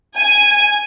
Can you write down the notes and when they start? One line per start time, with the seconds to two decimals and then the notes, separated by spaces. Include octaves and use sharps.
0.17 G#5